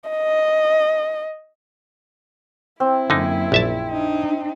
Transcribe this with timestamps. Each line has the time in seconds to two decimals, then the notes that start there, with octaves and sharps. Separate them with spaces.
0.10 D#5
2.80 C4 E4
3.10 F#2 D3 A#3 D#4 G#5
3.52 A#1 E5 A5
3.90 D4 D#4